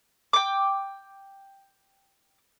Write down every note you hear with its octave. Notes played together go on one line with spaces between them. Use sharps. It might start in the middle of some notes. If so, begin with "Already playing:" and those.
G5 D6